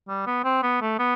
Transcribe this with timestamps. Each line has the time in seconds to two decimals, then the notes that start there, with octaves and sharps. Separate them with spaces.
0.08 G3
0.27 B3
0.44 C4
0.63 B3
0.82 A3
0.99 B3